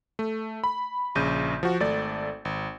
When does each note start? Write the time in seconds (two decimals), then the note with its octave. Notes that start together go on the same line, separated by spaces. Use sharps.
0.19 A3
0.64 B5
1.15 A#1 C#3 G6 D#7
1.63 F3 F#4
1.80 G#1 A3 D5 A6
2.45 G#1